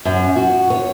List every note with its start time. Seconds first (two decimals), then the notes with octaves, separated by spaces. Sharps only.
0.05 F#2
0.36 F#4
0.70 C#5